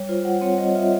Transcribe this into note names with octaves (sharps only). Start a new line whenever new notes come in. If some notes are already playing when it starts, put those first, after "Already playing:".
Already playing: G3 C#5
F4 C5
G3 F#5
C4 C#5
G3 D#5
F4 E5